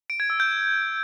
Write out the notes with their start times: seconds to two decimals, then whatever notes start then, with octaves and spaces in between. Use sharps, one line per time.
0.10 D7
0.20 G#6
0.30 E6
0.40 G6